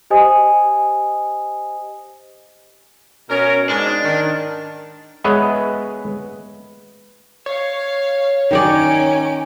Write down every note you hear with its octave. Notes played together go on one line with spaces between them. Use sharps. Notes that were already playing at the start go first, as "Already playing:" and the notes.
G4 C5 D#5 G#5 D#6
B2 C#4 A#4
G#2 G#3 D4
D#3
G#3 B3 B4 C#5 D#5 E5
C#5 F5
D#3 C#4 D#4 D5 D7